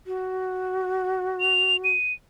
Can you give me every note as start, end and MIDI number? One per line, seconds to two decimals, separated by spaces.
0.06 1.93 66
1.40 1.77 101
1.84 2.13 99